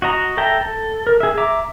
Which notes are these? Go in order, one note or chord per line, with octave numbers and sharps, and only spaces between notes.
F#4 D#5 A#5
A4 E5 G5 A#5
A4
A#4
G#4 E5
E5 A#5 D6